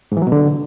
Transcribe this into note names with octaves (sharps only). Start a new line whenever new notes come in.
G#2
E3
F#3
B2
D3